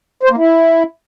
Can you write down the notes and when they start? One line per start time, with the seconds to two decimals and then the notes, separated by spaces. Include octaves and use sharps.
0.23 C5
0.30 A#3
0.38 E4